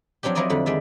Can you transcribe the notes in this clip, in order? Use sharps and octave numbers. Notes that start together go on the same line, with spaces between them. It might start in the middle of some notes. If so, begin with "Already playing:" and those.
F3 F#3 C4 D4 G4
F3 F#3 E4 A#4 D5 D#5
F2 D3 B5
D#3 G#3 D5 E5